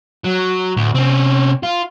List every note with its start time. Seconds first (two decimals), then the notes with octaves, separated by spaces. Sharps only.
0.24 F#3
0.77 D2 A2
0.95 C3 C4 C#4
1.63 F4